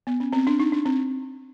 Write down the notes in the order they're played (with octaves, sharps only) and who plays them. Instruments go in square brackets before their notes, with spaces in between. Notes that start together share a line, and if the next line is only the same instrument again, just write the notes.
[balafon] B3
C#4
C4
D4
D#4
D4
C4